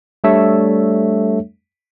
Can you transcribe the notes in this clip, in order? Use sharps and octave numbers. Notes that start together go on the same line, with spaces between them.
G3 A3 D4 A4 C#5 E5